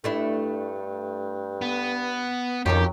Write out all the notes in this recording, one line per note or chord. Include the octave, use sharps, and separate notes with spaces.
G2 A3 D4 E4
B3
F2 D#3 F#3 B3 C#4 G4